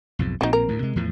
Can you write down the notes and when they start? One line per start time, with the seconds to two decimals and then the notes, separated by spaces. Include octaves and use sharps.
0.19 B1 F2 G#2
0.41 A#1 A#2 C4 D#4 F#4
0.53 A#4
0.69 D2 A2
0.82 C3 G#3
0.96 E2 A2 F3